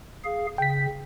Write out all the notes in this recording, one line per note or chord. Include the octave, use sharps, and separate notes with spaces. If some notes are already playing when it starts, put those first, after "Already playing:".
G#4 F5
C#3 G5 B6